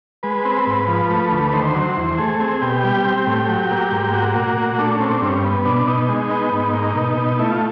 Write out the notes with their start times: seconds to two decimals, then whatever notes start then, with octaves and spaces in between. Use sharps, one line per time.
0.23 G#3 B4
0.45 C4
0.67 G#2
0.88 F3
1.10 A3
1.31 D2
1.53 D#3 C5
1.75 F#3
1.97 E2
2.18 A3 G#4
2.40 C4 G#4
2.62 B2 G4
2.84 G3
3.05 C4
3.27 A2
3.49 F#3
3.71 A#3
3.92 G#2
4.13 A#3 F#4
4.35 A#2
4.57 A#2
4.78 A3 D4
4.95 C4 C#4
5.11 D4
5.22 G2
5.28 C#4
5.44 B3
5.65 B2 D4
5.87 B2 D#4
6.09 G#3
6.30 B3
6.52 G#2
6.74 A#3
6.95 B2
7.17 B2
7.39 A3 E4
7.50 F4